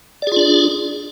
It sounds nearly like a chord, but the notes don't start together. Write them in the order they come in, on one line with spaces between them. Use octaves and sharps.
D5 G#4 F4 D4